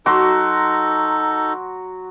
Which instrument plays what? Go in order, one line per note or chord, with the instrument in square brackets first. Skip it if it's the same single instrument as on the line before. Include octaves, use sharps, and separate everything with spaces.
[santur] F#3 F#4 C6 [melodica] D#4 A4